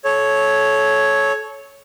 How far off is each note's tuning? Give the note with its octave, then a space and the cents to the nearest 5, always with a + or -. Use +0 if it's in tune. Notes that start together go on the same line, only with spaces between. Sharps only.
A4 -30 C#5 +0